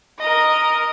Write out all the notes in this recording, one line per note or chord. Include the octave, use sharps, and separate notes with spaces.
A#4 D#5